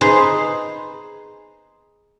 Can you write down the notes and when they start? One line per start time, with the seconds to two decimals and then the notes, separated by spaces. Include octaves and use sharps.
0.01 D#4 G#4 B4 C5